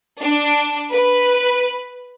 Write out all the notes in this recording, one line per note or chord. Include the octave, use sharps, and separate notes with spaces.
D4
B4